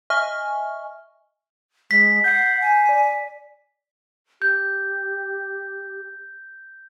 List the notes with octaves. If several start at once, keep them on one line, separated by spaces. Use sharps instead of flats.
D#5 E5 G#5 C#6 F6
G#3 B6
F#5 G6 C7
G#5
D5
G4 G6